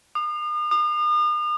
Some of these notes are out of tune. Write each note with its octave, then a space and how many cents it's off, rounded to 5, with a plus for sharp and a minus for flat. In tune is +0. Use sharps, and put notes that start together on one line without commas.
D#6 -40
D#6 -40